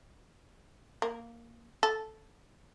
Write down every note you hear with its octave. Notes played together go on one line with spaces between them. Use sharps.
A#3
A4